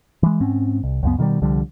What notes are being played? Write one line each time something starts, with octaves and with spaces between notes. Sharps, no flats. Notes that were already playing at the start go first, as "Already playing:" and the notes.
E3 G#3
G#2 C4 C#4
C2
C#2 F#2 B3
B2 D#3 F3 G3
C2 D3 F3 G3